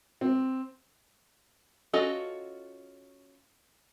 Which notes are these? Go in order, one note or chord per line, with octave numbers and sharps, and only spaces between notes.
C4
C#4 F4 F#4 A4 D#5